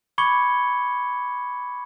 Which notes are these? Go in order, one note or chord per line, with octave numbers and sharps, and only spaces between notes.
B5 C#6 D6 G#6 C#7 G7